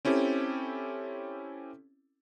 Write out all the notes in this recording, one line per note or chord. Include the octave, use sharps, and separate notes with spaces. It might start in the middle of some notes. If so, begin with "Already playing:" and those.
C4 C#4 E4 G4 A4